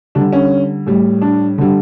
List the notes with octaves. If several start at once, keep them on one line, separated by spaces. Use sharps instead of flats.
D3 G3 D4
C#4
A2 G3
D4
D3 G3